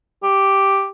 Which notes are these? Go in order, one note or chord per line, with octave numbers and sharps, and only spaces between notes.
G4